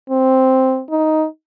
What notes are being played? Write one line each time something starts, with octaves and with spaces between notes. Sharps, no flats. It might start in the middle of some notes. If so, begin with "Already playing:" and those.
C4
D#4